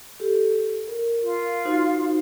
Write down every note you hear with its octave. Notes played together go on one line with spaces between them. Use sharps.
G4 A4
A#4
F4
D#4 F#4 C5